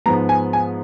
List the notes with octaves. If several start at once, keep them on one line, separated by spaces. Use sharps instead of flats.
G#2 F3 G#3 B3 A#5
G#5
G#5